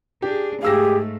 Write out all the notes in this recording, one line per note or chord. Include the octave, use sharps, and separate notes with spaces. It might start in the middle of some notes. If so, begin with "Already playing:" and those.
D4 G4 G#4
G#2 A3 G4 G#4 F5 E6 A#6